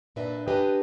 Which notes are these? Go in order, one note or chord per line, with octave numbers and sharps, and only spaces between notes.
A#2 D4 B4 D#5 E5
D4 G4 B4 D#5 G#5